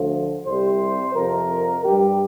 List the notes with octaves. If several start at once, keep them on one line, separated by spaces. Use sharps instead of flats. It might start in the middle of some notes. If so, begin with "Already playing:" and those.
Already playing: D2 D3 F3
C2 C3 G3 C5
F2 C3 F3 A#4
G2 G3 G4